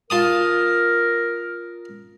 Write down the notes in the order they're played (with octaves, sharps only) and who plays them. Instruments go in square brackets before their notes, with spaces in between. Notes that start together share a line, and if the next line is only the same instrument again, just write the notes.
[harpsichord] F4 A5 D#6 [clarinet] A#4